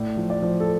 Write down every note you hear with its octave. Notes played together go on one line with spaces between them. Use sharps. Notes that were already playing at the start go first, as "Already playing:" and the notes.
Already playing: A2 D5
F3
D5
F3
A4